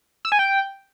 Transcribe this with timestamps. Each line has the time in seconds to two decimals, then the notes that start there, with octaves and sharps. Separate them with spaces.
0.25 E6
0.32 G#5
0.39 G5